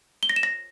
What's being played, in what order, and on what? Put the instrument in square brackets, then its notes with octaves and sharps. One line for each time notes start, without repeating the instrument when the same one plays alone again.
[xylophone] G7
A#6
E7
A#6